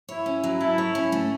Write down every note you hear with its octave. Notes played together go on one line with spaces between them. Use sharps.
E4 C#5
C#4
F#3
E4 A4
C#5
C#4
A3